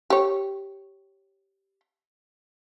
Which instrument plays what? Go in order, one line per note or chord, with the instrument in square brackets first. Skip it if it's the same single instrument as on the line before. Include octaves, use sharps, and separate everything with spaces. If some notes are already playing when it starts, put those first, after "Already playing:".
[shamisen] G4 C#5